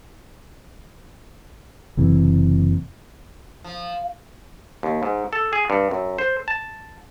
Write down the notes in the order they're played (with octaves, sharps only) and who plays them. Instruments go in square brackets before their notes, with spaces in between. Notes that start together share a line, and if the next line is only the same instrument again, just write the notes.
[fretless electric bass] F#1 C3 E3
[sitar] F3
[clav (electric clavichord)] D#2
G#2
A4
G#4
G2
F#2
C5
A5